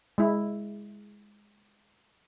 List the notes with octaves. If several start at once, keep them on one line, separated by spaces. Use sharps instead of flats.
G#3 E4